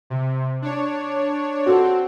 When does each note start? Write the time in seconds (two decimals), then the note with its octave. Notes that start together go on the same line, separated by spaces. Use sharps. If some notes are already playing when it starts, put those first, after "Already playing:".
0.10 C3
0.62 D4 C#5
1.66 C4 F#4 A4